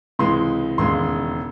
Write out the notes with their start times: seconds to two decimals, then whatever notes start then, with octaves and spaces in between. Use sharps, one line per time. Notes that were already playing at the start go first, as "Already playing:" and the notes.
0.19 C#2 C3 E3 G#3 C6
0.78 E1 D#2 C#3 G#3 C6